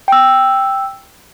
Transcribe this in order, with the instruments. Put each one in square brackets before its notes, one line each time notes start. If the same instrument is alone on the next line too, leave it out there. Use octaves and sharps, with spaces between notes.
[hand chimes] G5 E6